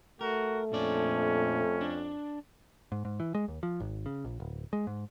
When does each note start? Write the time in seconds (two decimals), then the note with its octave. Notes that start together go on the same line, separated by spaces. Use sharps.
0.21 A3 F#4 A#4
0.72 F2 A#2 C#4 D4 D5
1.81 D4
2.92 G#2
3.05 G#2
3.20 E3
3.35 G#3
3.48 D#2
3.63 F3
3.80 G#1
4.06 C#3
4.25 A#1
4.40 D1
4.73 G#3
4.87 G#2